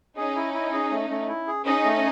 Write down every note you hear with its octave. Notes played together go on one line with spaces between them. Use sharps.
C#4 D#4 G#4
E4
E4
G#4
A3
A3
E4
G#4
C#4 D#4 G#4
A3